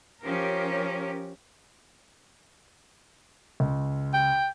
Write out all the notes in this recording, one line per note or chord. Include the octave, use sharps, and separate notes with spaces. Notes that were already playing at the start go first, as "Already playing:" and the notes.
F3 C#4 G4 A#4
C#2
G5